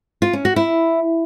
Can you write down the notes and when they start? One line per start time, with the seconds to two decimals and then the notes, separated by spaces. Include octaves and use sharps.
0.22 F4
0.33 C#4
0.45 F#4
0.56 E4